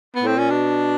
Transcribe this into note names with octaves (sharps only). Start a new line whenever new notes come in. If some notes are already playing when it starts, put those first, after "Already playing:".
B3
A2 C4
A#2 C#4
B2 D4